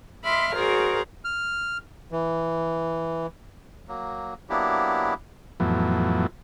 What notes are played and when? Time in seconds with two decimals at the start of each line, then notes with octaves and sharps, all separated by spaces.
0.24 D#5 E5 B5 C6 D6 F6
0.55 F#4 G#4 A#4 C5 D5
1.25 F6
2.12 E3
3.89 F#3 A#3
4.50 F#3 A#3 B3 D4 E4 G4
5.60 F2 A2 E3 F#3 B3